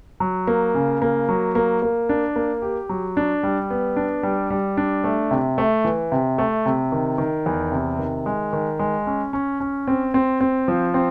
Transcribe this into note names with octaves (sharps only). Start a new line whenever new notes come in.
F#3
A#3
C#3
A#3
F#3
A#3
A#3
D4
A#3
G4
F#3
D4
G3
B3
D4
G3
G3
D4
A3
C3
A3
E3
C3
A3
C3
D#3
D#3
E2
C3
D#3
G#3
D#3
G#3
C#4
C#4
C#4
C4
C4
C4
F3
C4